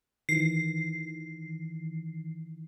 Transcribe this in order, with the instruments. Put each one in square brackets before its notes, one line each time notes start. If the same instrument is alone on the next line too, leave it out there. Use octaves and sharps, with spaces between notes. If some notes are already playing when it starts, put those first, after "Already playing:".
[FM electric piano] D#3 E3 [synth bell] C7